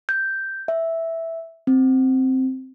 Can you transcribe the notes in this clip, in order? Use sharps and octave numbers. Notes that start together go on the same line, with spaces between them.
G6
E5
C4